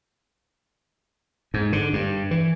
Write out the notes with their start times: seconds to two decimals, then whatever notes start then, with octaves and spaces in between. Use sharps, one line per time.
1.54 G#2
1.73 D3
1.93 G2
2.31 E3